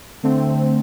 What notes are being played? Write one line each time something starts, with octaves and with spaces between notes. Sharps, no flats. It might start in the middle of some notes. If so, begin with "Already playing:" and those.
D3 A3 C4